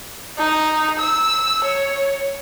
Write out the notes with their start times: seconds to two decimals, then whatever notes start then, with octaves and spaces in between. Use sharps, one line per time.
0.38 D#4
1.00 E6
1.64 C#5